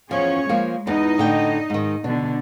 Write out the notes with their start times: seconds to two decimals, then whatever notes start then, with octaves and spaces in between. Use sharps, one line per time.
0.11 E2 G2 F3 C#4 G#4 C#5
0.49 F3 G#3 A#3 A#4
0.87 E2 E3 D#4 D#5
1.18 A2 D3 G5
1.70 G#2 D#3
2.04 B2 D3 D4